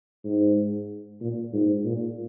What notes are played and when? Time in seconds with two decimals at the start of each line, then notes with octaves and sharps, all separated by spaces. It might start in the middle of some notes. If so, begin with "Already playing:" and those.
0.25 G#2
1.21 A#2
1.53 G#2
1.85 A#2